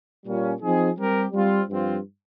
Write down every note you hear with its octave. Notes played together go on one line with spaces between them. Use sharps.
A#2 G3 A#3 C#4 F4
F3 C4 D#4 G#4
G3 C4 G4 A#4
G3 C4 F4
G2 F3 C4 F4